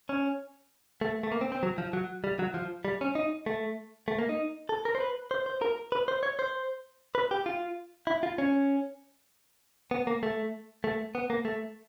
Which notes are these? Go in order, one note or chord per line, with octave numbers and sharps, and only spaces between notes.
C#4
A3
A3
A#3
C4
C4
F#3
F3
F#3
G3
F#3
F3
G3
C#4
D#4
A3
A3
A#3
D#4
A4
A#4
C5
B4
C5
C5
A#4
B4
C5
C#5
C5
B4
G4
F4
E4
F4
C#4
B3
A#3
A3
A3
B3
A#3
A3